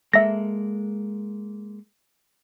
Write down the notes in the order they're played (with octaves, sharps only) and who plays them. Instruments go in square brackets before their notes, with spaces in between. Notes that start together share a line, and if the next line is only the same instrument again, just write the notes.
[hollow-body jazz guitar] G#3 A#3 A4 [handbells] E5 A#6